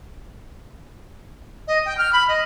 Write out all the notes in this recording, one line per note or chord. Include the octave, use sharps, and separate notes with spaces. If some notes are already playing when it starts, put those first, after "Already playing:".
D#5
G5
F6
B5
D#5